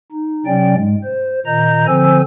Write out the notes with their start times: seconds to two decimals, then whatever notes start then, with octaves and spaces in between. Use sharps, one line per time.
0.12 D#4
0.46 C3 F#3 C#4 D5 G5
0.75 G#2 G#3
1.04 C5
1.46 A#2 D#3 D#5 A#5 G6
1.87 D3 F3 C4 C5 G#5 E6